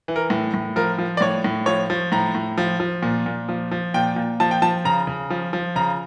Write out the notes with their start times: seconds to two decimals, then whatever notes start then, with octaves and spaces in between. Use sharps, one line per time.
0.08 E3
0.16 A#4
0.30 A2
0.54 A2
0.76 F3 A#4
0.98 F3
1.17 D5
1.21 A2 C#5
1.44 A2
1.66 F3 C#5
1.90 F3
2.12 A2 A#5
2.35 A2
2.58 F3
2.80 F3
3.02 A#2
3.26 A#2
3.49 F3
3.71 F3
3.94 A#2 G5
4.16 A#2
4.40 F3 A5
4.51 G5
4.62 F3 A5
4.85 C#3 A#5
5.07 C#3
5.30 F3
5.53 F3
5.76 C#3 A#5